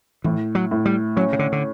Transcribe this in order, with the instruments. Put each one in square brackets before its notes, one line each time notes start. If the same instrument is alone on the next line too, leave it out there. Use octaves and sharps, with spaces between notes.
[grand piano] A2 [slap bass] E3
[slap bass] F#3
[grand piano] A2
[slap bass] G3
[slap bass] F#3 [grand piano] C#4
[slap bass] C#3
D3
D3